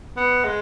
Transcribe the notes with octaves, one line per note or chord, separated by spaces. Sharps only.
B3
G#3